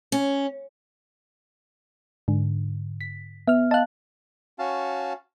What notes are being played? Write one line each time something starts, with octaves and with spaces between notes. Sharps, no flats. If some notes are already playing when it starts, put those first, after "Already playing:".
C#4
G#2 D3
B6
B3 E5 F6
D#5 F5 A5 F#6
C#4 F#4 F5 A5